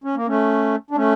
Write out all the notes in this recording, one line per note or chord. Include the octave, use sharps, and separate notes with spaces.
C#4
A#3
A3 C#4
D4
A3 C#4